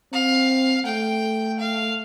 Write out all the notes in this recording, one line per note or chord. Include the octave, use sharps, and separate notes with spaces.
C4 F5
A3 G5
F5